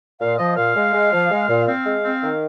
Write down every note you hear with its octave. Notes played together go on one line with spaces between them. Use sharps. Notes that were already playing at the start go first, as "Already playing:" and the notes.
A#2 F5
F3 D#5
A#2 F5
G#3
G#3
F3
G#3
A#2
C4 F5
G#3
C4
D#3